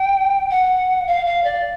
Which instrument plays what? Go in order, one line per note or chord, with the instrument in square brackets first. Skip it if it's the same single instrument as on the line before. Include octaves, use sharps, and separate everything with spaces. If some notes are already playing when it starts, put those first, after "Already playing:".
Already playing: [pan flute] G5
F#5
F5
F5
D5